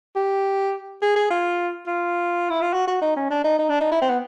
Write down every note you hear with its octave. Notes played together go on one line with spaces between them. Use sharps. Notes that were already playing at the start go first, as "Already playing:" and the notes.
G4
G#4
G#4
F4
F4
E4
F4
F#4
F#4
D#4
C#4
D4
D#4
D#4
D4
D#4
E4
C4
B3